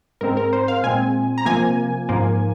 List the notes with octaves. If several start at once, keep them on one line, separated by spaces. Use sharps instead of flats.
G#2 G#3 C4 A#4
A#4
C5
F5
A#2 G#3 C4 G#5
A#5
C3 F3 A#3 G#5
G#2 F3 A#3